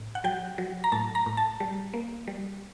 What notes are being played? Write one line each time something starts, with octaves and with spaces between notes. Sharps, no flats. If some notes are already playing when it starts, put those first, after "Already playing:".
Already playing: A2
F#5
F#3 G5
F#3
A#5
A2 A5
A#5
A2
A5
G3
A#3
G3